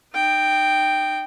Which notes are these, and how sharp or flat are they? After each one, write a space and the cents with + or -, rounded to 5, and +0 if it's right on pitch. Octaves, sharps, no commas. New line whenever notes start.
D#4 -30 G5 +0